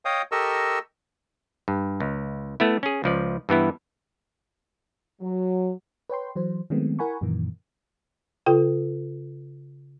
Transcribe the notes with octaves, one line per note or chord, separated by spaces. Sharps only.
C#5 D#5 F5 G5 D#6
G4 A4 A#4 D#5 C#6 E6
G2
C#2
A3 B3 E4
C#4 G#4
C#2 F3 D5
G2 E3 B3 E4
F#3
B4 C#5 G5 C6
E3 F#3 C5
D#3 F#3 G#3 A3 B3 C4
E4 A#4 F#5 G#5 B5 C#6
F#2 A#2 D#3 E3 A#3
C#3 F4 A4 G5